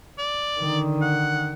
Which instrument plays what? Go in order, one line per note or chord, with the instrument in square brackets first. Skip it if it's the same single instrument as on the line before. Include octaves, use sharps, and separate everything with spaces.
[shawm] D5
[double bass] D3 D#3
[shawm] F#5